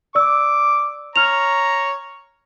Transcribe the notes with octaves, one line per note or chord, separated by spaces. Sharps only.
D5 D6 E6
C#5 A#5 F6 F7